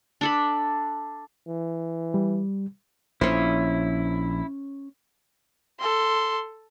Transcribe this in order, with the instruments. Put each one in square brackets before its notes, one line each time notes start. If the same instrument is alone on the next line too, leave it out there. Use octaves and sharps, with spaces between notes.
[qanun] D4 A4 B5
[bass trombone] E3
[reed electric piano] G3
[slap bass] A#1 [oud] C#4 C5 [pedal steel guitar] E4
[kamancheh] A4 C6